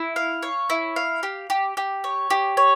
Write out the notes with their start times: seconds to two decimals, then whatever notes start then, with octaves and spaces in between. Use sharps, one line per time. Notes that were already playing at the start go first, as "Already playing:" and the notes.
Already playing: E4
0.16 F5
0.43 C#5
0.70 E4
0.96 F5
1.23 G4
1.50 G4
1.77 G4
2.04 C#5
2.30 G4
2.57 C#5